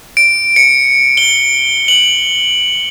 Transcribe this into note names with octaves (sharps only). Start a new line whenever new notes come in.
D7
C#7
G7
F#7